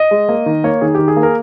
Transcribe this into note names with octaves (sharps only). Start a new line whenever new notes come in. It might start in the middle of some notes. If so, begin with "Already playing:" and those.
Already playing: D#5
G#3
A#3
D#3
A#3 C#5
D#3 G#4
D#3 G4
G#4
A#3
A#4